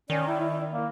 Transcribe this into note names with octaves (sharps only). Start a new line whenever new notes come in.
D#3 C#4 D5
E4
E4
A#3